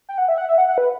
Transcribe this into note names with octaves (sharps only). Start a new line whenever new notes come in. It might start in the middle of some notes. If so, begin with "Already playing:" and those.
G5
F#5
E5
F#5
E5
F#5
F#5
B4